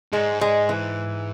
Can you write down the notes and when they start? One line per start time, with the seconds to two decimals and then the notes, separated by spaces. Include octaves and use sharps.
0.12 G#2 G#3
0.41 G#3
0.69 E3